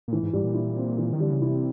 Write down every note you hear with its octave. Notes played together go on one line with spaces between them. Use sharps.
A#2
A2 E3
G#2
G#2 G3
A#2
E4
C4
E3
D#3
D3 G3
C#3
C3 E4